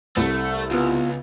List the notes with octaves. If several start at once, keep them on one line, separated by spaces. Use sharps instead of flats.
C2 A3
C#2 B3 F4